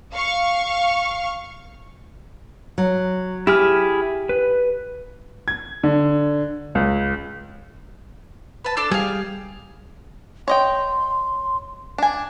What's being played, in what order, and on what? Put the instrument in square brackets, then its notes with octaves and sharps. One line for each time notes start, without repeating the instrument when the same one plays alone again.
[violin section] F5 C#6
[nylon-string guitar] F#3
[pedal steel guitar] E4 G#4 F6 [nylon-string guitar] G4
[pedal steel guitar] B4
[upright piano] G#6
D3
C#2
[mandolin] B4 A5
D4 A4 D5
[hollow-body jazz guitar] G3 [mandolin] G#4 F5
[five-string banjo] C#5 D#5 G5 [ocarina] C6
[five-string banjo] D4 G#5